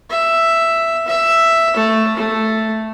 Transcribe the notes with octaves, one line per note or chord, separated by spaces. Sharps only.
E5
E5
A3
A3